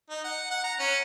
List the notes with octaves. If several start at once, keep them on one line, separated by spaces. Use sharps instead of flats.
D#4
F#5
F#5
A#5
C#4